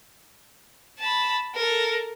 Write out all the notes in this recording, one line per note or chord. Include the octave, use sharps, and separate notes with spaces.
A5 B5
A4 A#4